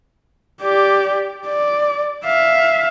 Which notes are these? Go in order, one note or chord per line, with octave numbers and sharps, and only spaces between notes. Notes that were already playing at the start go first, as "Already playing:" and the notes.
G4 D5
D5
E5 F5